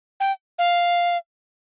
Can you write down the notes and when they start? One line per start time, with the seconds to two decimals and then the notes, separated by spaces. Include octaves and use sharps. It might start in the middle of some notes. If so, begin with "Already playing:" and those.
0.20 G5
0.59 F5